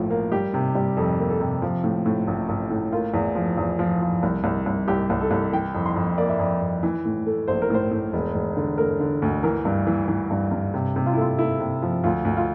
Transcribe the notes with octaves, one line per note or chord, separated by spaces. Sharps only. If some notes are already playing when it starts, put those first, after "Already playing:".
Already playing: A1 A2 F3
A#3
G3 G4
C3
G3
F2 A4
A#3
A4
C3
F3
A2
A2
A1
A1
A2
A#3 F4
E2
F3
E2
F3
F3
C2
C2
C2
C2 G4
C2
A4
C2
E3 G5
F2
C6
F2
A#3 D5
E5
F2 D5
F2
E3
A2
A3
A#1 C5
A#4
A2 C5
A2
E1
E1
D3
A3 A#4
D3
D2
E3 A#4
G2
E3
E3
G2
G2
C3
C3
F4
E4
A3 F4
A3 E4
C3
F3
D2 F4
D2
F4